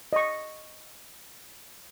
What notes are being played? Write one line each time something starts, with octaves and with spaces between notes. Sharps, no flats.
D#5 C#6